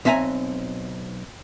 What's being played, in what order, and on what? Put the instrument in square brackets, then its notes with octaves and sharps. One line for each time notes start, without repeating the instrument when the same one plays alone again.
[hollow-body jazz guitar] B1 C4 E5 G#5 A#5